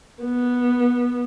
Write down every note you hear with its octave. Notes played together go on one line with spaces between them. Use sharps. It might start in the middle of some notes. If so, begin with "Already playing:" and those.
B3